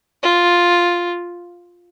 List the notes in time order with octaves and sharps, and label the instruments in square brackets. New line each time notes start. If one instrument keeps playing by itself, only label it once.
[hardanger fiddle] F4